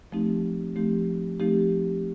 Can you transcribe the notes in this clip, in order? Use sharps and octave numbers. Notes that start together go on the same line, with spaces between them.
F3 A3 C4 D#4 G4
F3 A3 C4 D#4 G4
F3 A3 C4 D#4 G4